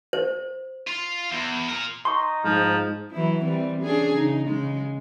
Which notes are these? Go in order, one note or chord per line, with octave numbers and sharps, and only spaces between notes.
C5
F4
E2
F4 A#4
D#4 C6 C#6
G#2 F3
E3 F#3 E4
E3 G3 C4
C#4 D4 G#4
C#3 D#4
C#3 G#3